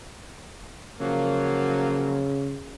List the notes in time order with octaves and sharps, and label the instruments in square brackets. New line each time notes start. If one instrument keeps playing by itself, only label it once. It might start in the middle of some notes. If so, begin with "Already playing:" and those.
[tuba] C#3 [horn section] F3 F#3 A#3